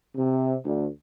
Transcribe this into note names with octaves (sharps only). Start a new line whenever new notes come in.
C3
D2